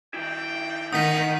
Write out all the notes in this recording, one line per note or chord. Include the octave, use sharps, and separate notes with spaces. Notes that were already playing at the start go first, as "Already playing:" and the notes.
D#3 E4 G5
F2 D#3 D#4 F#5 D#6 B6